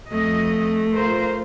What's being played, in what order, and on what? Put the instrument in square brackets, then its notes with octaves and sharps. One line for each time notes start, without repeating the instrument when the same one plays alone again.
[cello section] F2 D#5 [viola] A3
[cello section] F4 A#4 C5